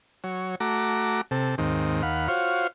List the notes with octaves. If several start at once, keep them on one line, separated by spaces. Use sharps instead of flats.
F#3 C#5
A3 F#4 A#5 D6
C3 A4
D#2 G#2 D#3 C4
D#2 F5 F#5 B5
F4 F#4 C5 C#5 F5